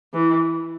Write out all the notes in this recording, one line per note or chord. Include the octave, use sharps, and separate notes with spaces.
E3